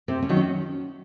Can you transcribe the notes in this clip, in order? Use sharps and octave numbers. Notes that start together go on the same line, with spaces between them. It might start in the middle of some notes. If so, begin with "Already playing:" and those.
C3 C4
C#4
D#3 F#3
C#4